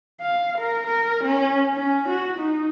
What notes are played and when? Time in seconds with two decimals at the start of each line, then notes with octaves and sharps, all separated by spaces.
0.21 F5
0.59 A#4
0.87 A#4
1.24 C#4
1.74 C#4
2.09 F#4
2.39 D#4